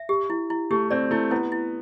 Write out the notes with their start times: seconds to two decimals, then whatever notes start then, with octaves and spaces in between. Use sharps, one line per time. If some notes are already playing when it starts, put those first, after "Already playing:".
Already playing: E5
0.09 G4
0.30 E4
0.50 E4
0.71 A3 G4
0.91 C4 D5
1.11 A3 E4
1.31 B3 E4
1.52 E4